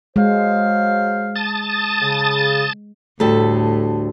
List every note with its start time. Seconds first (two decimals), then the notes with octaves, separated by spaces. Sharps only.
0.16 F#3 G#3 C5 F5
1.36 A5 D#6 A6
2.00 C#3
3.20 D2 A2 G3 A4